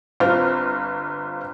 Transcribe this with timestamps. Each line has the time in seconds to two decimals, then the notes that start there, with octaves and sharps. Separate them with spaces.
0.20 G1 C4 F4 F6